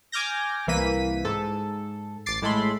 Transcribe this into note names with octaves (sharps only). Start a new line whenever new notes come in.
G#5 D6 F6 G6 A#6
C2 E3 A#3 B6 D#7
G#2 A4
A1 D6 A6 C7
A2 G#3 A4 B5 C6